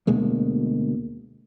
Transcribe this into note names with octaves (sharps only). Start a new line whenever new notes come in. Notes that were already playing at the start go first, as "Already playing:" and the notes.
D2 B2 G#3 A#3